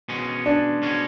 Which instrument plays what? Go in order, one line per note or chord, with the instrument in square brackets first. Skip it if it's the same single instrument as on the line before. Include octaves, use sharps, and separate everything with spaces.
[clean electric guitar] B2 G#3 C#4
[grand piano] D4
[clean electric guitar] B2 G#3 C#4